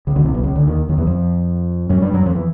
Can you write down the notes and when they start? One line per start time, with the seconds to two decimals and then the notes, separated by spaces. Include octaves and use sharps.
0.07 C#2 C#3
0.16 D2 D3
0.25 C2 C3
0.34 B1 B2
0.44 C#2 C#3
0.55 D2 D3
0.67 D#2 D#3
0.89 D#2 D#3
0.98 E2 E3
1.07 F2 F3
1.89 F#2 F#3
2.01 G2 G3
2.13 F#2 F#3
2.26 F2 F3
2.35 E3